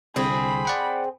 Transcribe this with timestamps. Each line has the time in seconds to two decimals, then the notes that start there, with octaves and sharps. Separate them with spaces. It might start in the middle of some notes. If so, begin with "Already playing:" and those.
0.16 C2 D3 C4 G#4 B5
0.65 D5 F#5 G5